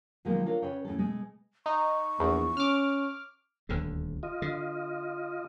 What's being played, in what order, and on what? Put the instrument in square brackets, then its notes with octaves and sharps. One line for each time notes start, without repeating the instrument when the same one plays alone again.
[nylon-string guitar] B2 D#3 F3 F#3 G#3 A#3
D4 F4 A4 A#4 C#5
C#3 B4 C#5 G5
A2 C#3 C#4 A4
B2 G#3 A3
[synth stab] D#4 [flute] C#6
[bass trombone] A#1 [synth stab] E2
[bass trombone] C#4 [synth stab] D6 F6
[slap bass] D#1 D2 D3
[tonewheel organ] F4 D#5
[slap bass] D3